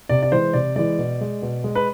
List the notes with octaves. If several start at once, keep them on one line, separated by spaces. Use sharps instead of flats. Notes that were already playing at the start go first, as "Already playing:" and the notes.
C3 D5
D5
E3 G#3 C5
C3 D5
E3 G#3 D5
B2
G#3
B2
G#3
B4